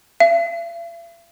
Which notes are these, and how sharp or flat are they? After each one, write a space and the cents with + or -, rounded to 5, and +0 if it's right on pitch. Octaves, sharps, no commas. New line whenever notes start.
E5 +45